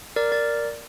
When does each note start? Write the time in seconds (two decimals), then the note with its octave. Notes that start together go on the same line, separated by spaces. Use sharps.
0.16 A#4 D5
0.32 A#4 D5